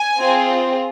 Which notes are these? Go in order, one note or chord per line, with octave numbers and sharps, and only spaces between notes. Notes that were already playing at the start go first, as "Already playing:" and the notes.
Already playing: G#5
C4 F4 G#4